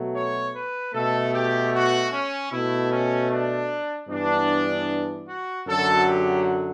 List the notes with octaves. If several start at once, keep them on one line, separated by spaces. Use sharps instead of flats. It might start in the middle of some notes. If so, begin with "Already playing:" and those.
Already playing: B2 F#3 A3
C#5
B4
B2 A3 A4
G4
F#4
C#4
B2 A3 E4
C#4
D4
G2 E3 B3 D4
F#4
F#2 D3 F#3 A4
G4